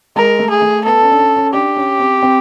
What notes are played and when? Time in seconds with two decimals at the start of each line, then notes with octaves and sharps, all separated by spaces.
0.16 G#3 A#4
0.39 A3
0.50 G#4
0.62 A3
0.85 B3 A4
1.02 C#4
1.12 D4
1.19 C#4
1.37 C#4
1.53 D4 G4
1.77 C#4
1.99 C4
2.23 C4